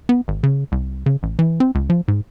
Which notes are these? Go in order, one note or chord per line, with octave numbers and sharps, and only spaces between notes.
B3
G#1
C#3
C2
C#3
A1
E3
C4
C#2
F3
G#2